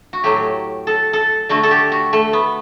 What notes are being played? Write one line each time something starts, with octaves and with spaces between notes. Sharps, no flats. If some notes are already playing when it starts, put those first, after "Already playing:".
F#4
A2 F#3 A3 G4
A4
A4
D3 A3 F#4
A4
G4
F#4
A3
B3